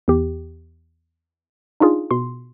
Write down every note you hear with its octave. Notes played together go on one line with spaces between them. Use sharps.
E2 G4
D4 D#4 F4 G#4
B2 C6